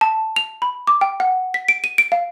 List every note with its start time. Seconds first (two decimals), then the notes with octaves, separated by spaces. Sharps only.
0.01 A5
0.36 F7
0.62 B5
0.87 D6
1.01 G5
1.20 F#5
1.54 B6
1.68 D7
1.84 D#7
1.98 D7
2.12 F5